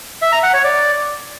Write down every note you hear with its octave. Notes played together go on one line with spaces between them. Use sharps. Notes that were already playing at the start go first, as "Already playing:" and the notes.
E5
A#5
F#5
C#5
D5